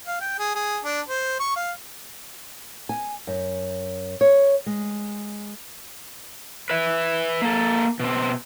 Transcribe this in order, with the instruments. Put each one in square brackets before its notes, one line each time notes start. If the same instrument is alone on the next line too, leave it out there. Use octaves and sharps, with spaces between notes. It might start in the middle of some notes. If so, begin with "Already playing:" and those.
[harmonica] F5
G5
G#4
G#4
D4
C5
C#6
F5
[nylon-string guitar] G#5
F#2
C#5
G#3
[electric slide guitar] B4 E5
A#3 A4
B2 C4